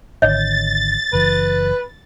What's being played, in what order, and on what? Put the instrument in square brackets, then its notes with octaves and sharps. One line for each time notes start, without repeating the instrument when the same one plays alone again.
[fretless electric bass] G#1 D3 [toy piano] C#5 D#5 [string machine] A6
[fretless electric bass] F#1 E3 [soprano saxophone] B4